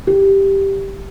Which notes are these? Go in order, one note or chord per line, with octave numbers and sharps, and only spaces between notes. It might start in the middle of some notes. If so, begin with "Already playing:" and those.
G4